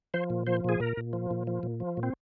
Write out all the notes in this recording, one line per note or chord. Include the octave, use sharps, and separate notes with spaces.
F3 C5
A#2
F3 C5
A#2 G#4
A#2 A#4
A#2
F3
A#2
F3
A#2
F3
A#2
C4